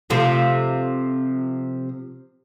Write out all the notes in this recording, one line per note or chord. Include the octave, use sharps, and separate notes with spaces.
C3 F3 A3